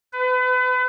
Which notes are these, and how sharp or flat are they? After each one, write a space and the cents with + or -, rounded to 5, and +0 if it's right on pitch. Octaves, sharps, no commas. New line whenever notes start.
B4 +35